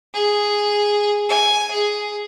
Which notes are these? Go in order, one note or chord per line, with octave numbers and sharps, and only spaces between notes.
G#4
G#5
G#4